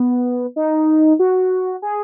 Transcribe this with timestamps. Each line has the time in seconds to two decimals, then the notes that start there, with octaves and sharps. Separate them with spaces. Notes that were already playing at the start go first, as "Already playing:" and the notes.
Already playing: B3
0.56 D#4
1.19 F#4
1.82 G#4